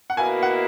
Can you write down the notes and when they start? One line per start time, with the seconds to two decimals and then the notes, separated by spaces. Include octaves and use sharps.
0.10 F#5
0.17 B2 A#3 E4 G#5
0.42 F#5